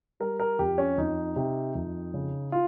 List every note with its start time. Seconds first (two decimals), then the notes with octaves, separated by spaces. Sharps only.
0.20 G3 A#4
0.40 A#4
0.59 F2 G4
0.78 C#4
0.98 F2 D#4
1.36 C3
1.75 F2
2.14 C#3
2.52 F4